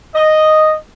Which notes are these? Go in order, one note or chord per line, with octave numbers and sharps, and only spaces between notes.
D#5